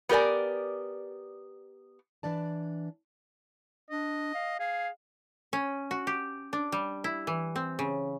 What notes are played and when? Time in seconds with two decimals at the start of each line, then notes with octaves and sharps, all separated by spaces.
0.09 B3 G4 A#4 D5 G#5
2.23 E3 D4 D5 A5
3.90 D4 D#5
4.34 F5
4.59 G#4 F5
5.53 C#4
5.91 F#4
6.07 G4
6.53 D4
6.72 G3
7.04 E4
7.27 E3
7.56 C4
7.79 C#3